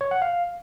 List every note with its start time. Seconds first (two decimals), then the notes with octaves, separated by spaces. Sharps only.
0.01 C#5
0.11 F#5
0.22 F5